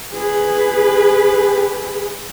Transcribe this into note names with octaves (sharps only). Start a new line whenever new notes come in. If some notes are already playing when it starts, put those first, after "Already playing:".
G#4 B4